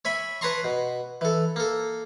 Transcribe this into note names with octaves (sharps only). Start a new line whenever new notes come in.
C#5 E5 G#5 B5
B4 C#5 A5 A#5 C6 C#6
B2
E3 A4
A#3 A4